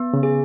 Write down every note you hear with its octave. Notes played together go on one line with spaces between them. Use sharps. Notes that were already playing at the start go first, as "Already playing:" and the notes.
Already playing: B3
C#3
G#4